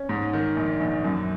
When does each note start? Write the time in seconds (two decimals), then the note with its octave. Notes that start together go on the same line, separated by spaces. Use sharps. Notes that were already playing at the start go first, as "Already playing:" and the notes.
Already playing: C#4
0.09 G#2
0.33 D#3
0.56 A#1
0.80 A#1
1.04 F#2